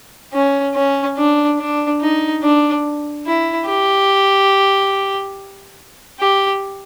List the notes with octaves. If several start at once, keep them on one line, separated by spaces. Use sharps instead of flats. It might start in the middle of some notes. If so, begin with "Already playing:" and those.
C#4
C#4
D4
D4
D#4
D4
E4
G4
G4